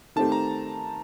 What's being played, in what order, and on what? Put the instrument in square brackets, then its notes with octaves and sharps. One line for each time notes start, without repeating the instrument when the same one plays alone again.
[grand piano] D#3 A3 C4 G4 [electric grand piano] A5
[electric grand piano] A#5